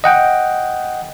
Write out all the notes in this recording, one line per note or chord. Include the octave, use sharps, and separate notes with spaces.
D#5 F#5 G5